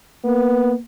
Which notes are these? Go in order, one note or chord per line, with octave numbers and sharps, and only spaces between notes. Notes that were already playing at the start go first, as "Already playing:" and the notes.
A#3 B3